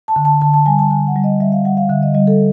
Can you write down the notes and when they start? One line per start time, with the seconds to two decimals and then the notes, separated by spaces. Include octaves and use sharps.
0.08 A5
0.16 D3
0.25 A5
0.41 D3 A5
0.54 A5
0.66 G3 G#5
0.79 A5
0.90 D3 G#5
1.07 F#5
1.16 G3
1.24 D#5
1.40 G3 E5
1.52 F5
1.65 G3 F#5
1.77 F5
1.90 D3 E5
2.02 D#5
2.14 G3 D#5
2.27 A4